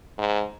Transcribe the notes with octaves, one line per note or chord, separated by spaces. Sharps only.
G#2